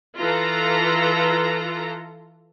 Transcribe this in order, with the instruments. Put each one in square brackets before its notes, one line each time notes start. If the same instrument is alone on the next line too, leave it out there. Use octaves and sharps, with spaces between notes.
[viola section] E3 F4 A4 A#5